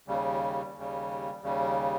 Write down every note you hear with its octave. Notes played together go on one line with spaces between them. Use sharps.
D#2 C#3 G3
D#2 C#3 G3
D#2 C#3 G3